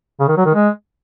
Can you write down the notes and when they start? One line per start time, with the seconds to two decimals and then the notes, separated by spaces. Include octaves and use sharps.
0.20 C#3
0.29 D#3
0.37 F#3
0.46 D#3
0.54 G#3